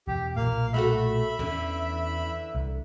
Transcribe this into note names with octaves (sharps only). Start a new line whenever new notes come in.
E1 E2 G4
B1 A#2 A#3 F5
A3 F#4 A4 E5 B5
E2 D3 E3 C#4
C2